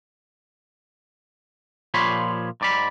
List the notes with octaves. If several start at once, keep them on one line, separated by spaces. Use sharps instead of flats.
A#2 F3 G4 C#5 B5 C6
G#2 D5 B5